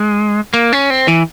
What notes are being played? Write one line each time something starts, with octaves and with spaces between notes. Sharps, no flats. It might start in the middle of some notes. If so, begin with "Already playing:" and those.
Already playing: G#3
A#3
C#4
C4
E3